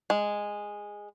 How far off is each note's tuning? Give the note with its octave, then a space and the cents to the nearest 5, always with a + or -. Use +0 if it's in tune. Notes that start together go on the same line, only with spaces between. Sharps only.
G#3 -10